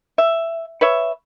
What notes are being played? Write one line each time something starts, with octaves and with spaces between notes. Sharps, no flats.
E5
B4 C#5 E5